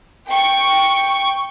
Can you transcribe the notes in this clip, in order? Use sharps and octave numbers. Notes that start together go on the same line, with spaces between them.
G5 C#6